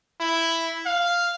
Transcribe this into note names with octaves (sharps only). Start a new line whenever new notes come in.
E4
F5